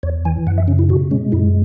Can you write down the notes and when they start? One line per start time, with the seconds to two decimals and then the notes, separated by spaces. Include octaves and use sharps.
0.03 E2 C#5
0.25 E3 G#5
0.47 F#2 F#5
0.58 E5
0.68 C#3 C#4
0.79 E4
0.89 B2 F#4
1.11 G#3 C#4
1.32 F#2 E4